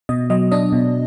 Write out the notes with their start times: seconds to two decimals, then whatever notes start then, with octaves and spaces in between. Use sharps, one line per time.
0.09 B2 D#5
0.30 F#3 D#5
0.52 D4 D#5
0.72 B2